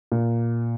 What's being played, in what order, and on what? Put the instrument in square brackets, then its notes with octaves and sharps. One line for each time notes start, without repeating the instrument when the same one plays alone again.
[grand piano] A#2